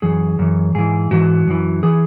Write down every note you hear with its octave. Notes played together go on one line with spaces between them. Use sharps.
F#2 E3 G#4
F#2 E3
G#2 E3 G#4
G#2 E3 F#4
F#2 E3
E3 G#4